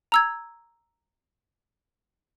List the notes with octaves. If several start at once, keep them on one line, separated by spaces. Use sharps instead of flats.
A#5 E6 G#6